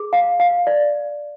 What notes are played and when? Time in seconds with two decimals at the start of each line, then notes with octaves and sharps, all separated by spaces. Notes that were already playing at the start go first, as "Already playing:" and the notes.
Already playing: G#4
0.13 F5
0.40 F5
0.67 D5